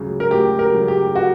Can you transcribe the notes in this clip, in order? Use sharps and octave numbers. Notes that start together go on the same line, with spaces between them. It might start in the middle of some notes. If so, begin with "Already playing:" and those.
Already playing: D2 C#3 F#3
A#4
D2 G4
A#4
C#3 F#3
G4
F#4